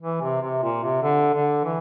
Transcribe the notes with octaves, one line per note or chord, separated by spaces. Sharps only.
E3
C3
C3
A#2
C3
D3
D3
E3